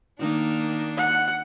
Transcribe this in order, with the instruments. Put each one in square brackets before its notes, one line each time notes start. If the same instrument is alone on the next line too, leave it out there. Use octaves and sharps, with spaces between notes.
[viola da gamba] D#3 A#3 [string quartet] D4
[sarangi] F#5